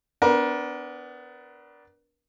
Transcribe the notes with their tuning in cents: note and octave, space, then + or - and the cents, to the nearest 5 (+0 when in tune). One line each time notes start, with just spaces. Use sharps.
B3 +25 D4 -10 A#4 +35